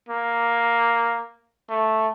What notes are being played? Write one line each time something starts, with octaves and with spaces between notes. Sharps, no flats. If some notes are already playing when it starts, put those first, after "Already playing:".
A#3
A3